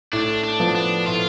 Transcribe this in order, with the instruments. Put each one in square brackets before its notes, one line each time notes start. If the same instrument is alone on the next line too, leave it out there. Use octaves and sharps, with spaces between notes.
[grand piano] A2 [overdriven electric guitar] D4
[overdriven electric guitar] D4
[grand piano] F3 B3
[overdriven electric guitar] D4
[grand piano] A2 [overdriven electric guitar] F4